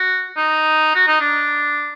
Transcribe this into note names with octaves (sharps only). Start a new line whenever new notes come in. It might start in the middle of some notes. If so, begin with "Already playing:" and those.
Already playing: F#4
D#4
F#4
D#4
D4